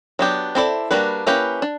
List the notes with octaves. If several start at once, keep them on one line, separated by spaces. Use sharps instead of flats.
F#3 B3 D4 G4
C4 E4 A4 D5
G3 A#3 D4 F#4 B4
A#3 C#4 E4 G4 B4
D4